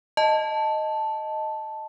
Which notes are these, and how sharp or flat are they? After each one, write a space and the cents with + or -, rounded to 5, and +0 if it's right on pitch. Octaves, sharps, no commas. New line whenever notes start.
D#5 +0 A5 +0